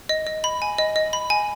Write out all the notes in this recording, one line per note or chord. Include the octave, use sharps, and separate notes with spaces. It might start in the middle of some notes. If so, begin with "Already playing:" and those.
D#5
D#5
B5
G#5
D#5
D#5
B5
G#5